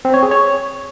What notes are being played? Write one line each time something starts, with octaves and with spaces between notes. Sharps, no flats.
C4
C#5
G#4
C#5